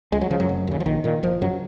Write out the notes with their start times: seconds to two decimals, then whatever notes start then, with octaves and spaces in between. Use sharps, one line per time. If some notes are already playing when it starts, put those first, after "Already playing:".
0.12 C#2 G#3
0.21 F#3
0.30 C#3 F3
0.40 F#2 F#3
0.49 F1
0.67 D#2 C#3
0.80 F3
0.86 A#1 D#3
1.04 A#2 D#3
1.23 F#1 F3
1.41 F#2 C#3 F#3